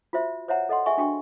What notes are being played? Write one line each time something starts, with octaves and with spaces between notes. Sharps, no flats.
F4 F#4 C5 E5
C5 C#5 E5 F#5 A#5
A4 D#5 F#5 C6
G#4 E5 G#5 C#6
D4 F#4 G5 C#6